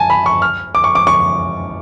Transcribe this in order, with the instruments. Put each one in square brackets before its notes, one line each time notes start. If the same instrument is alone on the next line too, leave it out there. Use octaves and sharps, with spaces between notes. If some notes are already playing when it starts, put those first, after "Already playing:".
Already playing: [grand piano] G#5 A5
B5
C#6
F6
D6
C#6
D6
C#6